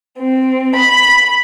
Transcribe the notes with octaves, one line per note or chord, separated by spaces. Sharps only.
C4
B5